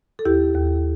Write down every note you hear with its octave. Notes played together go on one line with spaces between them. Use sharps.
A4
D#2 E4 G4
D#2